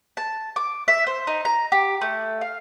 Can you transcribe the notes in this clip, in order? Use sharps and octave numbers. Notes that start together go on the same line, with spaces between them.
A5
D6
E5
C5
D#4
A#5
G4
A3
F5